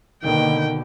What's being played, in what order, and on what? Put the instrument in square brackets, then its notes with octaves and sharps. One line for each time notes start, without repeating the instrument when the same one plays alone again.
[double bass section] B2 D3 A#3 [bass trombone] D#3 [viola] G5